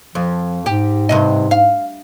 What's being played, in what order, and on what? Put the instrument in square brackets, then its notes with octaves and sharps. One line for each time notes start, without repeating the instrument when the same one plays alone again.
[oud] F2 [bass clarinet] F3
[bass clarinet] G#2 [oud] G4
[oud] G2 C3 D#5
F5